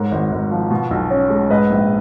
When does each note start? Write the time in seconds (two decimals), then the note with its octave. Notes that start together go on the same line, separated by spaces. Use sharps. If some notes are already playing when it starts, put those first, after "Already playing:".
Already playing: G#2 A#4 C#5
0.11 G#1
0.32 G#1
0.51 F3
0.70 B2
0.91 B1
1.10 C#4
1.30 G#3
1.50 G#2 B4 D#5
1.70 A#1